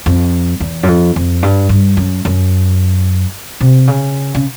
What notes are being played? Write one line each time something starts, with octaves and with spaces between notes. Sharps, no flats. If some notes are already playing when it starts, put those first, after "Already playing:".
F2
E2
F#2
F2
F2
G2
G2
F#2
F#2
C3
C#3
C#3